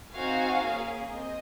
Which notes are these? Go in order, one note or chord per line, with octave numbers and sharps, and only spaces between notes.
C4 D#4 F#4 F5 G#5
A#3 C#4 G#4
C4 D#5